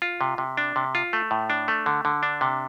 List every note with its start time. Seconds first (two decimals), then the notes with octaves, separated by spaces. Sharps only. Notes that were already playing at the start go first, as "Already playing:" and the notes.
0.02 F4
0.21 C3
0.38 C3
0.57 D4
0.76 C3
0.95 F4
1.13 A3
1.31 A2
1.50 D4
1.68 A3
1.86 D3
2.05 D3
2.23 D4
2.41 C3